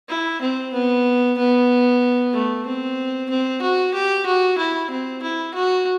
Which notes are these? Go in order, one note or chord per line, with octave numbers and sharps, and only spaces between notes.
E4
C4
B3
B3
A3
C4
C4
F#4
G4
F#4
E4
C4
E4
F#4